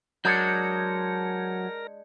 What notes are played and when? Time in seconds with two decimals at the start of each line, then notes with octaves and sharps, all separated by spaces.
0.25 F#3 G#3 D4 A#4 G6 G#6 C#7